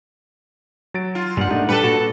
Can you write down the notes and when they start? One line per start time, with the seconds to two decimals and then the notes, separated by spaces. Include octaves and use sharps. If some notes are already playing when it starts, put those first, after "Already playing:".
0.94 F#3 A6 D7
1.15 F4
1.37 G2 A#2 G3 F#5
1.51 A3 D4 D#4
1.69 G3 D4 G4 A4 B4 C#7
1.84 A#2 F#4